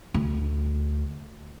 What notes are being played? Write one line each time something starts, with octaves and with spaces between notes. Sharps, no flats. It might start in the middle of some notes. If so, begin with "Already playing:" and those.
D2